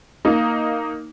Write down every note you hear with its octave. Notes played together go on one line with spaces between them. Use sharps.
A#3 D#4